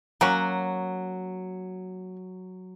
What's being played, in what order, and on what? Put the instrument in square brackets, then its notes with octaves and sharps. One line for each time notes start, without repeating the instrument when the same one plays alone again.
[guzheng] F#3 [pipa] A#3 C#4 F#4